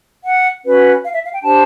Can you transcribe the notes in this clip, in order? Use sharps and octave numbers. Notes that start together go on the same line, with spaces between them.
F#5
C#4 F#4 B4
F5
E5
F5
G5
D4 G4 C5 A5